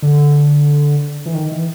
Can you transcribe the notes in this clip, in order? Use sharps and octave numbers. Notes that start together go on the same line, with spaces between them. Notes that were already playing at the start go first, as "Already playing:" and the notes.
D3
E3
D#3
E3